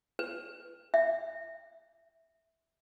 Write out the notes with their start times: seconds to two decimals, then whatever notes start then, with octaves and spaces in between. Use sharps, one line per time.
0.19 B4
0.94 E5